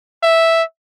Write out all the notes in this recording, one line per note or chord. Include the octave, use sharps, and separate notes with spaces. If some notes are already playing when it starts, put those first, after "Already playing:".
E5